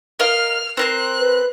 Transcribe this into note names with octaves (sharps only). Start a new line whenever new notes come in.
A#4 D#5 F5 F6
C4 A#4 C5 F#6
B4